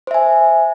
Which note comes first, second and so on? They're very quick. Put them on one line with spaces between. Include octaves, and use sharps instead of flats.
C5 E5 G#5